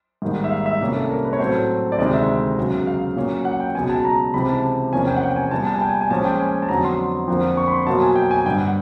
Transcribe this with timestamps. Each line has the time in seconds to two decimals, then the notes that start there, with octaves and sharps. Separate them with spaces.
0.22 G#2 D#3 G3 A#3
0.44 E5
0.51 F5
0.66 E5
0.81 C2 A#2 G3 A#3 C#4
0.96 A4
1.10 A#4
1.25 B4
1.33 C#5
1.39 A2 F#3 A3 C4 C5
1.92 D5
1.98 D2 C3 D#3 G#3 D#5
2.14 E5
2.57 F#2 C#3 F#3 B3
2.87 F5
3.16 A#2 F#3 A#3 C#4
3.45 F#5
3.60 G5
3.75 C#2 B2 F#3 B3 G#5
3.90 A5
4.05 A#5
4.34 C#2 C3 E3 B5
4.49 A5
4.93 E2 C3 F3 A#3 C#4 G#5
5.07 G5
5.16 F#5
5.21 G5
5.36 G#5
5.51 A#2 G3 B3 A5
5.66 A5
5.74 G#5
5.81 G5
5.89 G#5
6.01 G#5
6.10 A#2 F3 G#3 C#4 A5
6.25 G5
6.40 G#5
6.62 A5
6.69 F2 D3 F#3 B3 A#5
6.84 C6
7.28 F2 D3 F3 A#3
7.57 C#6
7.68 B5
7.72 C6
7.86 B2 F#3 A#3 A5
8.02 G#5
8.16 G5
8.31 G#5
8.45 G2 D3 G3 G5
8.61 F#5